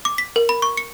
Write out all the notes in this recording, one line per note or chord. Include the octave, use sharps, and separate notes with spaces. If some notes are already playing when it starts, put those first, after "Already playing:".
D6
B6
A#4
B5
C#6
C#7